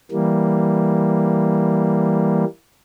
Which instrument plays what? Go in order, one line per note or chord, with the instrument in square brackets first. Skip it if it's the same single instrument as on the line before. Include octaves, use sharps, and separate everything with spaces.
[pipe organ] E3 G3 A#3